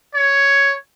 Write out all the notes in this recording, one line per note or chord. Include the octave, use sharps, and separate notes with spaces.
C#5